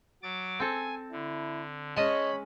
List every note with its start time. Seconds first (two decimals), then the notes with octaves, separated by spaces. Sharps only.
0.23 F#3 D6 A6
0.60 C4 A4 G#5
1.12 D3 E4
1.97 G#3 C#4 C#5 D#5 A5 B5